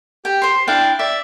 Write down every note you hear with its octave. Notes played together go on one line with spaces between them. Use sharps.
G4 G5
C5 C6
D4 E4 F5 G5
D5 E5